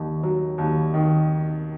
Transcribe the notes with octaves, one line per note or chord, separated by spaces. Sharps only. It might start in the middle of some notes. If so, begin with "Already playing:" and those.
Already playing: D#2 D#3
F#3
D#2
D#3